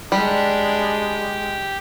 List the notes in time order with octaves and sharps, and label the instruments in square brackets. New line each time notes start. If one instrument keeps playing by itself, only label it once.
[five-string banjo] G3 [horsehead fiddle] G#3 [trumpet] D4 [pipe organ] G4